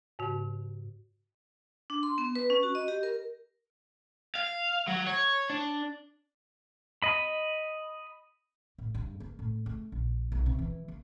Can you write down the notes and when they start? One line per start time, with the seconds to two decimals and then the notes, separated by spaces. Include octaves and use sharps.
0.19 G#2 C#3 F#4 C#5
1.90 D4
2.03 C6
2.18 B3
2.35 B4
2.50 C#4
2.63 F#4
2.75 D#5
2.88 G4
3.03 A#4
4.35 F5
4.88 F#3
5.07 C#5
5.50 D4
7.02 D#5 B5
8.78 A2
8.95 G2
9.20 A#3
9.39 A2
9.66 A3
9.92 A#1
10.32 B1
10.46 C3
10.59 E3
10.88 A#3